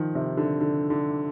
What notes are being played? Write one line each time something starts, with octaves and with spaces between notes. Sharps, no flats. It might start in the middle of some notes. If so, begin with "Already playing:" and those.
Already playing: D#3 F3
C3
D3
D3
D3